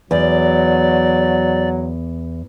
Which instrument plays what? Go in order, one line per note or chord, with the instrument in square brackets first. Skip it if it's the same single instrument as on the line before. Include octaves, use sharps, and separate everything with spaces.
[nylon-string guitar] E2 [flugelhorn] F#3 [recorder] D5